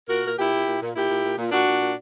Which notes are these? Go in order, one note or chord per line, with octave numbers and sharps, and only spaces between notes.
A#2 F#4 A#4
A#2 A#4
A#2 E4 G4
A#2
A#2
A#2
A#2 E4 G4
A#2
A#2
A#2
A#2 D4 F#4
A#2
A#2